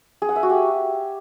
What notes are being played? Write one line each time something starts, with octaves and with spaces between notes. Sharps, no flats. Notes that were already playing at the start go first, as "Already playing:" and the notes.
G#4
F#5
E5
F#4
G4